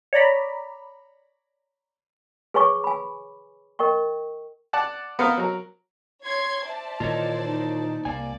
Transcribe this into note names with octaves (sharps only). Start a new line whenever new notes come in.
C#5 D5 A#5 B5
G#4 B4 C#5 G#5 C#6 D6
G#5 B5
A#4 D#5 G5 C#6
D5 F#5 A5
B3 A#4 C5 F5
F#3 A#4
C#5 C6 G#6
C5 D5 E5 A5
A#2 D#3 E3 F4 A#4 C#5 D#5
D#4
C2 A#3 D5 G#5